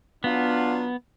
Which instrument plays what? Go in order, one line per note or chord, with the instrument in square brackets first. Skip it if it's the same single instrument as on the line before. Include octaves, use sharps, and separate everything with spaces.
[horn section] F#3 D4 F4 [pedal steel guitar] B3